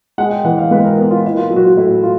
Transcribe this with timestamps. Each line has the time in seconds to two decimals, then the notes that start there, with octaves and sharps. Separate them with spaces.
0.18 G#3 F#5
0.31 G5
0.44 E3 F#5
0.58 F5
0.71 G#2 B4
0.84 A#4
0.98 B3 A#4
1.11 F4
1.25 A#3 E4
1.37 F4
1.50 F#3
1.56 F#4
1.64 F4
1.77 A2 E4
2.03 F4